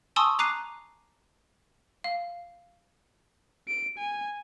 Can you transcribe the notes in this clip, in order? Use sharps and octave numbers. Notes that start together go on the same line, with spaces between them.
G#5 A5 C6 C#6 D#6 E6
A#5 D6 F#6 C7 D#7
F5
D7
G#5